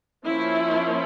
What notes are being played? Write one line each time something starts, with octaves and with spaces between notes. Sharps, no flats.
F3 A#3 C#4 E4